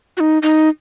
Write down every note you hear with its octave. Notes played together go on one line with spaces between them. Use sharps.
F#4
D#4
D#4